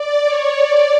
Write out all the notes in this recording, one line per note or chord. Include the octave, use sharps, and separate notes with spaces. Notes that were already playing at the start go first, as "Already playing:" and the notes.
Already playing: D5
C#5
D5